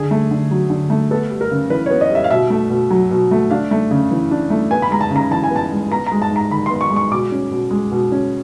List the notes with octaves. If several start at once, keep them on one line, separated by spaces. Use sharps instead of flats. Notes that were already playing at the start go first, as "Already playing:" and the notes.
Already playing: D3 G#4
A3
D3
F#3
D3
A3
B3 A4
G3
A#4
C#3
E3 B4
B3 C#5
D#5
G3 E5
F5
B2 E5
A3
B2
F#3
B2
A3
D4 F5
A3
C#3
E3
D4
A3
B3 G#5
B5
G#3 A#5
A5
C#3
A#5
E3 A5
G#5
B3
A5
G#3
B3 A#5
A#5
G#3
A5
G#2
A#5
D#3 B5
B3 C6
C#6
G#3
C#6
B2 D6
C#4
B2
G#3
B2
C#4